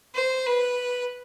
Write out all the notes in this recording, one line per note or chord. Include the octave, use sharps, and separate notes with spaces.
C5
B4